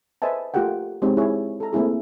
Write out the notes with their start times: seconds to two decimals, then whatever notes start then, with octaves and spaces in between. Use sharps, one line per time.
0.22 B4 C5 D#5 E5 G#5 A5
0.54 A3 F4 G4 A#4 F#5 G5
1.02 G#3 C4 D#4 G4 C#5
1.17 E4 G#4 C#5
1.60 A4 A#5
1.73 A3 A#3 C4 E4 G#4